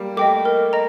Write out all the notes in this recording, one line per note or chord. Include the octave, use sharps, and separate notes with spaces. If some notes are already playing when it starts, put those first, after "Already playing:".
Already playing: G3 A#3
A3 D#5 G5 D6
A#4
D#5 A#5